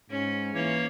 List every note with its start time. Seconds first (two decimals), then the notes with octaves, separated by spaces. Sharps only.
0.10 G#2 C#4
0.54 E3 A#3 C#5